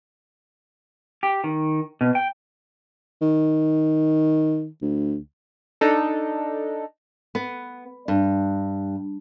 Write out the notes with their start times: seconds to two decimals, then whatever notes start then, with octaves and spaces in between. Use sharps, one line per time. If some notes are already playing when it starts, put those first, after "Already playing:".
1.23 G4
1.44 D#3
2.01 B2
2.15 G5
3.21 D#3
4.82 D2
5.81 D4 D#4 A4
7.35 B3
8.08 G2